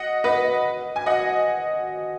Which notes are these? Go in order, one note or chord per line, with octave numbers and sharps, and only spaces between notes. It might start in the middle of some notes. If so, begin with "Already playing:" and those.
Already playing: D#5 F#5
B4 D#5
G#5
D#5 F#5